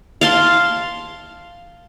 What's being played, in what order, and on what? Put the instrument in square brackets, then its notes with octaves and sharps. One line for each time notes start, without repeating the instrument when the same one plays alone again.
[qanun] F5 A5 C6